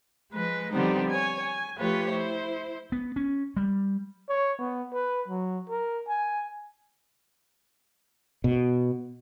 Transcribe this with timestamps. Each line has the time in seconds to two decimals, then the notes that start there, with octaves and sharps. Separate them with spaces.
0.33 F3 G#3 B4
0.73 D3 F3 G3 B3 C4 D#4
1.10 C#5 G#5
1.44 G#5
1.77 F3 A3 F4 G4 B4 C#5
2.10 E4 C5
2.92 B3
3.16 C#4
3.57 G3
4.29 C#5
4.59 B3
4.93 B4
5.28 F#3
5.69 A#4
6.08 G#5
8.44 B2